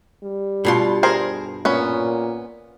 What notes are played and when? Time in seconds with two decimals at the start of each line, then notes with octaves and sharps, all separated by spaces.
0.24 G3
0.65 G2 B2 F4
1.03 G#4 A#4 C5
1.65 A#2 B3 C#4